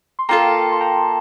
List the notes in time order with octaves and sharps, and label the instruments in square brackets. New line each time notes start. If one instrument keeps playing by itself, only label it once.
[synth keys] C6
[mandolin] A#3 F4 A4 [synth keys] G5 A#5
[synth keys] C6
G5 A#5